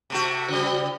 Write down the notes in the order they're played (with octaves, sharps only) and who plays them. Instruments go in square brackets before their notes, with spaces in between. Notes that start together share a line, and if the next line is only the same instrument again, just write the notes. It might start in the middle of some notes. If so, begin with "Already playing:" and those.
[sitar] C3 A3 F#4
[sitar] C#3 G3 [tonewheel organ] F#4 C5 G5